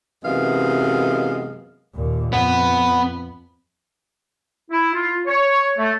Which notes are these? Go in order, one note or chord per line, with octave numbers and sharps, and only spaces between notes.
F#2 C3 E3 G#3 B3 F5
D#2 A#2
F2 B3
E4
F4
C#5
A3